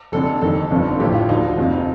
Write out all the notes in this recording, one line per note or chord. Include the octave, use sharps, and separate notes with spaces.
F1 F2 D3 A4
F1 F2 C3 D#3 A4
G1 F2 D3 F3
A#1 A2 F3 G4
F4
D2 D3 F3 D#4
F1 F2 C3 F3